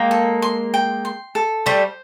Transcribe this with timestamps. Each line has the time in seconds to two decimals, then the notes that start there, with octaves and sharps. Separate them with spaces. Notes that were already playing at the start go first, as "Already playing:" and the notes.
Already playing: G#3 A#3 G5
0.11 A4
0.42 C6
0.74 G5
1.05 C6
1.35 A4
1.66 G3 A3 C5